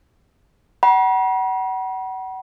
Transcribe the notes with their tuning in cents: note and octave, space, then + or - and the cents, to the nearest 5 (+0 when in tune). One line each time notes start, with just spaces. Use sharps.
F#5 +30 B5 -45